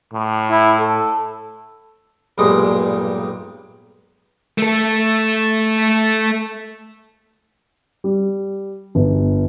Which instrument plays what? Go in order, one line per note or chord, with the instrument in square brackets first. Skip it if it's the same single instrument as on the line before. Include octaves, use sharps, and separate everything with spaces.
[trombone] A2
[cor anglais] E4
A4
[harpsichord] B1 G2 A#2 G#3 D#6
[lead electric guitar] A3 A4
[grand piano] G3
G1